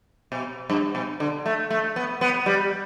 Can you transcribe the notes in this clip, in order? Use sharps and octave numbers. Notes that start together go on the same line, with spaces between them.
B2
G2
B2
D3
A3
A3
B3
B3
G3